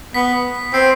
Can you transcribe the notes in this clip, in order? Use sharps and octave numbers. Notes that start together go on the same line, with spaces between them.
B3 B6
C4 C7